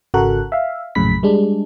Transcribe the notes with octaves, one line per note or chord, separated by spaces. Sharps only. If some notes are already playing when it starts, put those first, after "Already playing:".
G#1 C#3 F#4 A4 A#4 F#6
E5 F5
A#1 F#2 A2 C#3 B5 B6
G3 G#3 D4